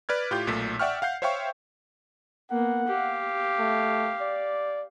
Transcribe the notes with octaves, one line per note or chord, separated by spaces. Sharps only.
B4 D5 F6 G#6
A2 F4 G4 G6
B1 A#2 A3 B6
D5 E5 F#5 G5 C#6 F6
F5 F#5 G6 C7
C5 C#5 E5 F5 G5 C#6
A#3 B3 F#5
G4 F5
A3
D5